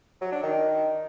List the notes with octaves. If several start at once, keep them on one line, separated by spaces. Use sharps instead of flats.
F#3
D4
D#3